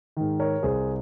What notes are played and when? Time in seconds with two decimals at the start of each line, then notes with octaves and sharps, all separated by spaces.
0.17 G#2 D#3
0.40 A#4 C#5
0.63 C2 G#4 C5